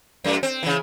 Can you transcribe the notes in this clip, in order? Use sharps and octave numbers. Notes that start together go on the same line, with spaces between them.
F#2 A3
C4
C#3 E3